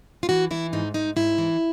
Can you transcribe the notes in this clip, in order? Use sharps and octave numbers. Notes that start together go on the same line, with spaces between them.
F4
E3 F#4
E3 E4
G#2 D#4
G#2 D#4
G#2 E4
E3